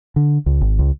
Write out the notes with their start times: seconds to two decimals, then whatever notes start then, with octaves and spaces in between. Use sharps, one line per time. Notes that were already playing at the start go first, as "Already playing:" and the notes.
0.16 D3
0.46 C#2
0.61 G#1
0.79 C#2